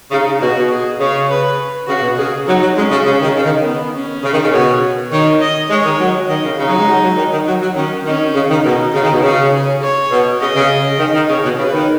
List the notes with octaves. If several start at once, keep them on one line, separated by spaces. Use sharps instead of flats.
C#3 D#4
C#3
B2 F#4
B2
G#4
C#3 C#5
B4
C#3 F#4
B2
C#3 G#4
F#3 D#4
F#3
G#3 C#4
C#3
C#3
D#3
C#3
D#3
B3
C#4
C#3
D#3
C#3
B2 C#5
D#3 C#5
D#5
G#3 C#5
D#3
F#3
D#3 D#5
C#3
C#3 D#4
F#3
G#3
F#3
F#3
D#3
D#3
F#3
F#3
D#3 C#4
D#3 C#4
C#3
D#3
B2 D#4
C#3
D#3
B2
C#3
G#4
C#5
B2
C#3 D#5
C#3
D#3
D#3
C#3 C#5
B2
C#3 B4
D#3